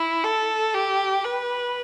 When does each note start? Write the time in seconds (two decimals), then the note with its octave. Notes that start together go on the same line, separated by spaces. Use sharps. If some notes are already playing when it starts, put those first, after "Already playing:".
Already playing: E4
0.24 A4
0.74 G4
1.24 B4